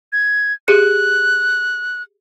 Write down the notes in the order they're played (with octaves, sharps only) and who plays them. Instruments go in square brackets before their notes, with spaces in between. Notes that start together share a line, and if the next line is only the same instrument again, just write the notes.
[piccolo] G#6
[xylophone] G4 G#4 C#7 [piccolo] F#6